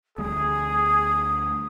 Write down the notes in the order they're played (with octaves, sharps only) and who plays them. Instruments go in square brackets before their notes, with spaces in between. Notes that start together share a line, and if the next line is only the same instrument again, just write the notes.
[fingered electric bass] D2 G3 A3 [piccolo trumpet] G#4 [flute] D#6